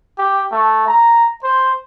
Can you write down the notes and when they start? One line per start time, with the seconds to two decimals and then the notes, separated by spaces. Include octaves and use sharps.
0.18 G4
0.52 A3
0.88 A#5
1.44 C5